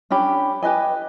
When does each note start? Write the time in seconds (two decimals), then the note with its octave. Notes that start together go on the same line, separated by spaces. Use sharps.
0.10 C#4 D4 G4 B5
0.62 G4 B4 D#5 G#5